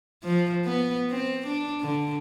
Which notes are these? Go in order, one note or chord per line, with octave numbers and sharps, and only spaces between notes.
F3
B3
C4
D4
D3